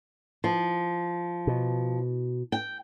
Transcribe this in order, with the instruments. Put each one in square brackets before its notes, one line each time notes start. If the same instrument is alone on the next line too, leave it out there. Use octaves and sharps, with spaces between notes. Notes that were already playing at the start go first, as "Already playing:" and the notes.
[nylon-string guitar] F3
[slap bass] B2
[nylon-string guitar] G5